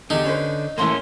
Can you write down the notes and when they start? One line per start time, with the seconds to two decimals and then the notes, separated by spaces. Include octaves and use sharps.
0.10 E2 D3 D#4 G4
0.25 C#4 B4 C5
0.78 C#2 A2 E3 A#3 C#4 C6